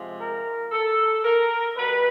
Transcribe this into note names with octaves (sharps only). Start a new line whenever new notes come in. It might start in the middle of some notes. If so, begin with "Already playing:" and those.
Already playing: C3 F3 G#3
A#4
A4
A#4
B2 G3 B4